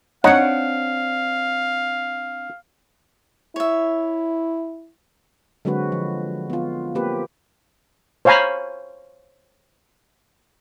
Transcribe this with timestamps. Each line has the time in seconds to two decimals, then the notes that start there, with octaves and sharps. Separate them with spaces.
0.24 C4 D4 D#4 C#5 F5 F#5
3.56 E4 C#5 E5
5.65 D3 F#3 G#3 C4 F#4 B4
5.92 F3
6.50 B3 F4
6.95 A#3 C4 G4 B4
8.25 C5 C#5 F5 G#5 A#5 B5